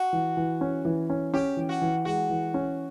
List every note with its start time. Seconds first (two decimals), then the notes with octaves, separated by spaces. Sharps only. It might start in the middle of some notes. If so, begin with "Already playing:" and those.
Already playing: F#4
0.13 E3
0.37 E3
0.61 C#4
0.85 E3
1.10 C#4
1.34 C#4 G4
1.57 E3
1.69 F#4
1.82 E3
2.05 G#3 F#4
2.30 E3
2.54 C#4